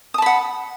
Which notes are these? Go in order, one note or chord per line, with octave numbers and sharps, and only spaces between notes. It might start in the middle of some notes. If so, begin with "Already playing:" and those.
F#5 A5 B5 D#6